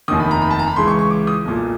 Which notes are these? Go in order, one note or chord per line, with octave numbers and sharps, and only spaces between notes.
F1 D#2 D#3 D#6
B5
A#5
B5
A5
A#5
B5
C#2 C#3 E3 C6
C#6
C#6
D6
D#6
B1 A#2